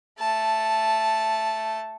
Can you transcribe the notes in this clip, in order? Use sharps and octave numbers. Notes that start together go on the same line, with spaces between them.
A3 A5